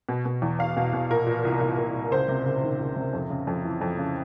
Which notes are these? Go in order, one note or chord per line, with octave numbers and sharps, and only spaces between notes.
B2
B2
E2
E2 F5
B2
B2
A#2 A#4
A#2
C2
C2
A#2
A#2
C#2 C5
C3
C#2
D#3
C#2
C3
F2
C#3
F2
E3
F2
C#3